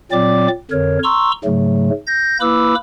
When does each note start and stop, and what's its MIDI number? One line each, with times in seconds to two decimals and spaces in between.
0.12 0.48 46
0.12 0.48 54
0.12 0.48 60
0.12 0.48 74
0.12 0.48 86
0.71 0.98 41
0.71 0.98 50
0.71 0.98 70
0.71 0.98 73
1.03 1.31 82
1.03 1.31 84
1.03 1.31 85
1.03 1.31 88
1.44 1.90 44
1.44 1.90 49
1.44 1.90 54
1.44 1.90 57
2.07 2.37 91
2.07 2.37 94
2.40 2.75 58
2.40 2.75 64
2.40 2.75 71
2.40 2.75 83
2.40 2.75 86
2.40 2.75 88